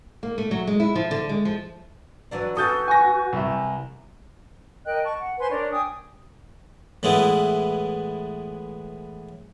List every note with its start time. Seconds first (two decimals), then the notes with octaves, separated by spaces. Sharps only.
0.23 A#3
0.38 A3
0.51 F#3
0.67 G#3
0.80 E4
0.95 F3
1.11 D3
1.29 G#3
1.45 F3
2.31 E3 F#3 D4
2.57 E3 C#4 F#4 A4 D#6 G6 A6
2.88 G#5 C#6 A#6
3.33 C2 E4 E5
4.85 A#4 D#5 G5 F#6
5.03 A5 C#6
5.20 F#5
5.39 B4 C5 G#5 C6
5.50 D4 A#4 C#5 D5
5.71 G5 G#5 D#6
7.03 A2 E3 G#3 B3 E4